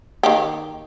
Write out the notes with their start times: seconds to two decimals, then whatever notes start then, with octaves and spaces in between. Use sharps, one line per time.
0.23 D#3 A#3 G4